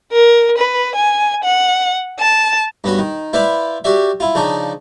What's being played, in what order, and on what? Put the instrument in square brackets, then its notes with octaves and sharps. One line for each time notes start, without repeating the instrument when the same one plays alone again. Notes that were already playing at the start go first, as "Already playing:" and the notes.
[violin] A#4
B4
G#5
F#5
A5
[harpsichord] G2 B3 C#4 F#4
D#3
E4 B4 C5 D5 E5 F5
F#4 G4 D5 E5
E4 F4
C#3 F3 D4 D#4